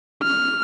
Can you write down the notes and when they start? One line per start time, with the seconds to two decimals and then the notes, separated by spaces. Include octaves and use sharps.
0.23 F6